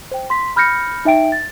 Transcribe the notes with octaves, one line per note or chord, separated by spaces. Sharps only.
C5 G5
C6 B6
B5 F6 G6 A#6 C#7
D#4 E5 G5 D7
A6